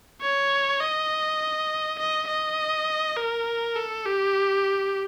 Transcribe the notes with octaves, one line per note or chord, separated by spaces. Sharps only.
C#5
D#5
D#5
D#5
A#4
A4
G4